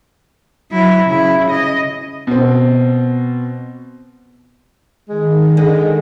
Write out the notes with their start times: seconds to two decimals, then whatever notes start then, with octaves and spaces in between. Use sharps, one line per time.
0.71 F#3 E4
1.06 C#3 E4
1.51 D#5
2.27 B2 C4
5.09 D#3 G#3
5.57 D3 G#3